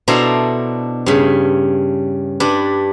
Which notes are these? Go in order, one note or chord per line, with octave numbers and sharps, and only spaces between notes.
B2 D4 E4 A4 C5 A#5
G2 C#3 B5
G2 D4 B4